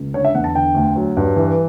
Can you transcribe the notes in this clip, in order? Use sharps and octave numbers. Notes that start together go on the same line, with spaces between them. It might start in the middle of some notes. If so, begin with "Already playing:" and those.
Already playing: C#2
D3 C#5
E5
E2 F#5
A5
D3 G5
D2
F#3
G2
E3